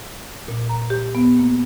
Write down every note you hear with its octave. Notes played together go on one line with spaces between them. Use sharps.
A#2
A#5
G4
B3
A#3